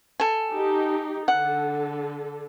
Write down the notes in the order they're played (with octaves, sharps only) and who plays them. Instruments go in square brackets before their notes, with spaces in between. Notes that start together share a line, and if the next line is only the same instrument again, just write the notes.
[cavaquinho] A4 G#5
[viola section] D#4 G4
[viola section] D3 A4 [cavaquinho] F#5